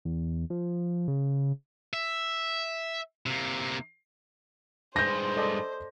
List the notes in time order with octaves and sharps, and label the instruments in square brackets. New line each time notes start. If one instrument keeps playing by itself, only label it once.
[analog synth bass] E2
F3
C#3
[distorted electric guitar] E5
C3 A#3
[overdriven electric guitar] G2 G#3 [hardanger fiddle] C5 [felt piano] G6 A#6
[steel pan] A4 D5 D#5